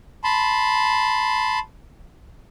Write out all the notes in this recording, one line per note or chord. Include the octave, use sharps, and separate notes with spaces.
A5 B5 C6